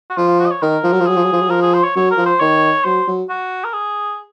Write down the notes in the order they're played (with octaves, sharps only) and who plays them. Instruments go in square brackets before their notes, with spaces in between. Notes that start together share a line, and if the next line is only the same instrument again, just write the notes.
[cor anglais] F#4
[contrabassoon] F3 [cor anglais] F4
[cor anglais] F4
F#4
D#5
C#5
[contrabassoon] D#3 [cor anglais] A#4
[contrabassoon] F3
F#3
F3
[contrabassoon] F#3 [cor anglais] G#4
[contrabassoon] F3
F#3
F3
F#3
[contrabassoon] F3 [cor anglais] A#4
[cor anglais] G#4
C5
C#5
[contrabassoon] F#3 [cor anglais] C#5
[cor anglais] A#4
[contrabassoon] F3
[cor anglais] C5
[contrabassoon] D#3 [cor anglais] C#5
[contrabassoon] F#3 [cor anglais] C5
[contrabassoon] F#3
[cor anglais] F#4
A#4
G#4